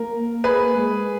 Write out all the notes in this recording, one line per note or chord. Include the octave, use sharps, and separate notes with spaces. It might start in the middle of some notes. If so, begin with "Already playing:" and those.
Already playing: A#3 A#4
A#3 G#4 B4
G#3